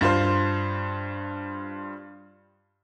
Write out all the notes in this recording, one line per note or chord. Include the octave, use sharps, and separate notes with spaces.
G2 F4 C5